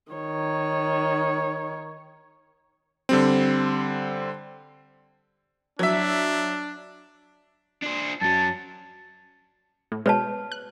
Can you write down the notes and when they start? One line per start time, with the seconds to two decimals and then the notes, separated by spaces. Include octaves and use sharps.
0.12 D#3 C#5
3.09 D3 G3 C4
5.79 F#3 D4 E5
7.83 D4 C5
8.21 F#2 F#3 A5
9.92 A2
10.06 B2 G#3 B4 C#5 A5
10.52 F#6